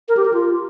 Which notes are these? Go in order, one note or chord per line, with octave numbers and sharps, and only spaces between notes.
A#4
G4
A#4
F4